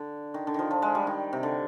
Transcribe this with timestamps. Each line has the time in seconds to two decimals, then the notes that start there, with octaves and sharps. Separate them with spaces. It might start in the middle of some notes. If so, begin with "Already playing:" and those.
Already playing: D3
0.34 D#3
0.47 D3
0.54 D#3 F3
0.71 F3
0.82 G#3
0.95 G3
1.07 D#3
1.33 C3
1.43 D3